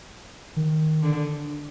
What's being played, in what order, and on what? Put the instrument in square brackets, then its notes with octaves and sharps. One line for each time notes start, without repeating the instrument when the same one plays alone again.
[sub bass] D#3
[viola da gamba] D3